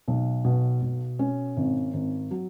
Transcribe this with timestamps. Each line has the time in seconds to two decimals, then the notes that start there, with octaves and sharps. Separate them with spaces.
0.08 B1
0.45 B2
0.82 B2
1.19 C#4
1.57 G#1
1.93 G#1
2.31 F#3